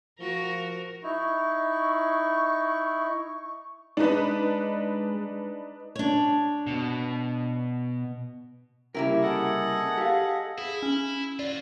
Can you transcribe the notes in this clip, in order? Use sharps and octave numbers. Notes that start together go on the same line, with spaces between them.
F3 F#4 A#4
D#4 E4 C#6
G#3 D4 D#4 B4
D4 C#5
B2
C2 C#3 A#3 E4 G4 A#4
G#4 A4 D#5 F#5
G4 F5
E4 G#4
C#4
F4 F#4 D5